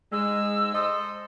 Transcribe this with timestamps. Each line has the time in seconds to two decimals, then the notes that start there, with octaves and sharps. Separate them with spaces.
0.12 G#2 G#3 E6
0.75 A4 C5 D#5